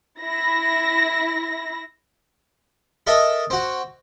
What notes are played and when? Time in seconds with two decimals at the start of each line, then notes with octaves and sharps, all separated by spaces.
0.21 E4 A#6
3.07 A4 A#4 D#5 E5
3.50 C4 F#4